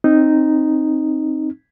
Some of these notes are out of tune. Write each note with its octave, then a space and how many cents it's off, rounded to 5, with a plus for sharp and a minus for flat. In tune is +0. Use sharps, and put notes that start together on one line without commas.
C4 +20 D#4 -5